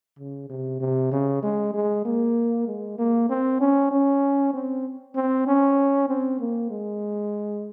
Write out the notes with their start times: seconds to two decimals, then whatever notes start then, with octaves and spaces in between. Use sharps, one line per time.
0.19 C#3
0.50 C3
0.80 C3
1.12 C#3
1.43 G#3
1.74 G#3
2.05 A#3
2.67 G#3
2.98 A#3
3.29 C4
3.60 C#4
3.91 C#4
4.54 C4
5.16 C4
5.47 C#4
6.09 C4
6.40 A#3
6.71 G#3